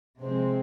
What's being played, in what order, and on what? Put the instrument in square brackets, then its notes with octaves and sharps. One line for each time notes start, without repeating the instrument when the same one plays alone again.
[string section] C3 F3 G#3 C4